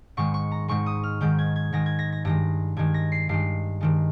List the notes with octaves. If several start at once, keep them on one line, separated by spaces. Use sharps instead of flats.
G#2 D#3 G#3 C#6
C#6
A#5
G#2 D#3 G#3 C#6
D#6
F6
G#2 D#3 G#3 G6
G#6
G#6
G#2 D#3 G#3 A#6
G#6
A#6
A#6
G2 D#3 G#3 A#6
G2 D#3 G#3 G#6
A#6
C7
G2 D#3 G#3 C7
G2 D#3 G#3